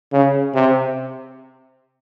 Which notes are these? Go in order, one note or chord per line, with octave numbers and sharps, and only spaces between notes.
C#3
C3